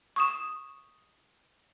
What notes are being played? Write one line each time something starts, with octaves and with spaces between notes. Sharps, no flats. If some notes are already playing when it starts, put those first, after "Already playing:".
C#6 D#6 E7